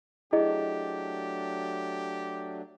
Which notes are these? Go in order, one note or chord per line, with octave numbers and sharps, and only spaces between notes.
F#3 A3 D4 E4 G4 G#4 D#5